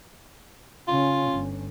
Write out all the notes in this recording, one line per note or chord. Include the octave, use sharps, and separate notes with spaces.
C#3 C#4 F4
G1